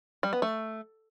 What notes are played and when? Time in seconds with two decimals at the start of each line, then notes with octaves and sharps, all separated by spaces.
0.23 G3
0.33 B3
0.42 A3